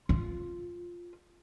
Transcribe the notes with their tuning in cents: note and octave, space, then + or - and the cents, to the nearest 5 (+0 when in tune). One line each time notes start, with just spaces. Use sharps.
F4 +0